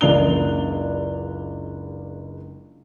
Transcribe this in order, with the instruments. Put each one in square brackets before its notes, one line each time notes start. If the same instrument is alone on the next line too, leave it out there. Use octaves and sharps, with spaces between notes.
[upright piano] F#1 C#2 D4 F7 G7